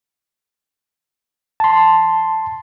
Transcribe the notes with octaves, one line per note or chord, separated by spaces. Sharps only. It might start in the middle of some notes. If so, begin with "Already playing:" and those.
A5 C6